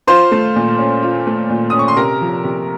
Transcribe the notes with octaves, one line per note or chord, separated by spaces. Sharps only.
F4 C5 C6
A3
A#2
C#4
F4
A3
A#2
C#4 D#6
C#6
C6
C3 A#4 A#5
F3
C3